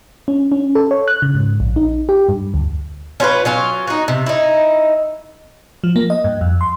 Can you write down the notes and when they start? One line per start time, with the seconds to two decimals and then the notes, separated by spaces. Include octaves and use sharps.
0.28 C#4
0.52 C#4
0.75 A4
0.91 C#5
1.08 F#6
1.22 C#3
1.35 G#2
1.60 A#1
1.76 D#4
2.09 G4
2.29 G2
2.54 D2
3.20 C#4 F4 A4 B4
3.45 F#3 C#4 F4
3.87 D#4 F#4
4.08 C3
4.26 D#4 E4
5.84 F3
5.96 A#3
6.10 D#5
6.24 G2
6.41 F2
6.61 C6